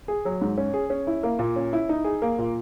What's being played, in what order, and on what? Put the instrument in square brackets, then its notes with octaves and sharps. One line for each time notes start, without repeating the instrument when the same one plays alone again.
[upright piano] G#4
F#3
G#2
C#4
G#4
C#4
E4
A#3
A#2
C#4
E4
D#4
G#4
A#3
A#2